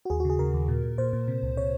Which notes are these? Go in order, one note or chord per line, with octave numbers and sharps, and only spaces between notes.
F#4
D#2 G#4
F#4
C#3 G#4
C#3 A#4
D#2
A#2
A#2
A#2 C5
A#2
C3
C#2
C3 C#5